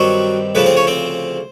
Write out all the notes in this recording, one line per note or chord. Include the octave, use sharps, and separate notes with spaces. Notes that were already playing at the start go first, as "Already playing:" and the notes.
Already playing: G2 D#3 F#3 G3 C4 F#4
D2 C#3 F3 B3 B4
C4 C5
C#4 C#5
C4 C5